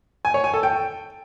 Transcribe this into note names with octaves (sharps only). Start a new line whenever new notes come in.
G#5
C#5
G#5
A4
G5